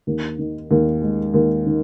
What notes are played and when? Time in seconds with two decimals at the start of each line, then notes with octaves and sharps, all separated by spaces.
0.07 D#2
0.39 D#3
0.71 D#2
1.02 G#3
1.34 D#2
1.66 D#3